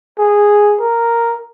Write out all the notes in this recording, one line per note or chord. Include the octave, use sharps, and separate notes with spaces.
G#4
A#4